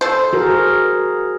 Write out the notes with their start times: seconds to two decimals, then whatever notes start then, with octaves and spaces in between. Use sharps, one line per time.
0.01 A4 C5
0.33 F#4 G#4 A#4